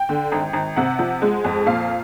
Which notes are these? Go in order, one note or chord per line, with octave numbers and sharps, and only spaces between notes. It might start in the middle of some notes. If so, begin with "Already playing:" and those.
Already playing: G5
D3
G#1
G#1
C3 F#5
F3
G#3
F2
A#2 F5